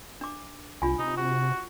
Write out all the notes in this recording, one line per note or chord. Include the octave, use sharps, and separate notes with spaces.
D4 D6
C2 D4 F4 G#5
C3 D#4
F#4